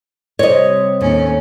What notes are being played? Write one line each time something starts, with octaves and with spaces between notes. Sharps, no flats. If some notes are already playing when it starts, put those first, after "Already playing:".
C3 G3 C#5 D#5
D#2 A2 C#4